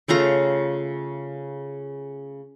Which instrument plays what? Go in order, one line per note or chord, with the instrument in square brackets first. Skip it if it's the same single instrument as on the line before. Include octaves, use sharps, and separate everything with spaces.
[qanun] C#3 A3 F4 A#5